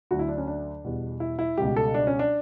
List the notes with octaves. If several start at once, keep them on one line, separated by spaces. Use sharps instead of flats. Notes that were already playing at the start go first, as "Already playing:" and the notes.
D2 D3 F#3 F#4
E4
D4
C#4
D4
E2 B2 G3
E4
E4
C#2 B2 G3 G4
A4
D4
C#4
D4